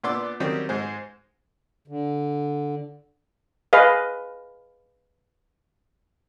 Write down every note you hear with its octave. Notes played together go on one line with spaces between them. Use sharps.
A#2 B3 D4 C6 D6 E6
D#3 F#3 G3 C4 C#4 G4
G#2 G#3 C5
D3
G#4 B4 D#5 F5